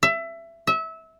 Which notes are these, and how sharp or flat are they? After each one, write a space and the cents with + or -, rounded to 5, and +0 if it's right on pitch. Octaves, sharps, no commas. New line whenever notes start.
E5 +20
E5 -25